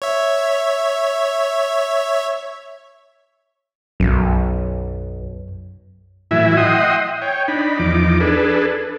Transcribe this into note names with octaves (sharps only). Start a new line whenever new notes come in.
C#5 E5
B1 F#2
A2 E3 F#3 E4 E5 G#5
D#5 E5 F#5 G5 C6 D#6
C#5 G5
D4 D#4 B5
E2 F3 D#4 D6
D4 G#4 A4 B4